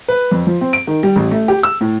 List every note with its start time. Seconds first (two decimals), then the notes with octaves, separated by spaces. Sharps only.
0.08 B4
0.31 F2
0.47 F3
0.61 C4
0.73 D7
0.87 D#3
1.03 G3
1.16 A1
1.31 A3
1.48 G4
1.63 E6
1.81 A2